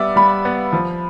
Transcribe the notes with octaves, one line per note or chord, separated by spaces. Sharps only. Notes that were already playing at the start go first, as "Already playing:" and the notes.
Already playing: G3 B3 D5 E5
G3 B5
B3
F3